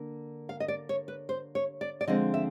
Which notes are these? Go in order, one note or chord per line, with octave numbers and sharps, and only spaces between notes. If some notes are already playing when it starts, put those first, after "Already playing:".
Already playing: D3 A#3
F5
D#5
D5
C#5
B4
C5
C#5
D5
D5
D3 F3 G#3 C4 D#5
E5